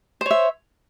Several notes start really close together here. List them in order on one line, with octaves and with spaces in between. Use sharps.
C5 C#5 E5